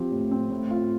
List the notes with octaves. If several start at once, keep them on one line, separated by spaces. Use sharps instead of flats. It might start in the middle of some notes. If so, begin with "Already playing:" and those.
Already playing: F3 C4 G4
A2
C4
A2
F4